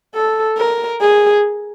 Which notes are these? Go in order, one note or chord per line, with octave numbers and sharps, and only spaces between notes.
A4
A#4
G#4